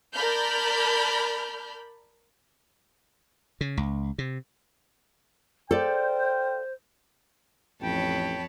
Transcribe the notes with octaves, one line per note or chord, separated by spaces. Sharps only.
A#4 D5 A5 B5 F6 G6
C#3
C#2
C3
F4 A4 C5 D5 G5
A1 F2 C#5 G5 A5 B5